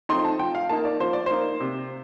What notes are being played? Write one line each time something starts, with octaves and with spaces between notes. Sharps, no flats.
F3 A3 C4 D#4 C6
A5
F3 G5
F5
A#3 D#4 A5
D5
F3 C5
D5
A#3 D#4 C5
C3